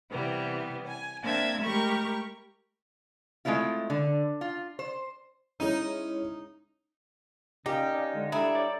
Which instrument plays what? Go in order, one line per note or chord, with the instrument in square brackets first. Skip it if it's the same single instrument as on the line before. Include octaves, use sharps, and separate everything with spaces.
[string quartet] C3 E3 G3 B3
G#5
A#3 C4 D4 E5 A5 G#6
G#3 A3 G4 A#4 B5 C#6
[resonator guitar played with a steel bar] G#3 A3 C4 E4 F4
D3
F4
C5
[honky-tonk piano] G#3 C#4 E4 [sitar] D#4
[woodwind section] A#2 C#3 C#4 [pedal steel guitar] D#4 [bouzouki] G4
[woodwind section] C#4 [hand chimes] D5 F5
[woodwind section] D3 G#3
[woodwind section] G3 D4 A4 [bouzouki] E4 [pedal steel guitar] G#4 [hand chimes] E5 A#5 D7
[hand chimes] C#5 [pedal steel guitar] D5